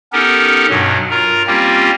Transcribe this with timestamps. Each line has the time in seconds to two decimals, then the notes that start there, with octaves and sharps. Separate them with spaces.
0.13 B3 C#4 D#4 G4 A4 A#4
0.69 G2 B2 F#3
1.11 F4 A#4 A#5
1.47 G3 A#3 C4 C#4 F4 G4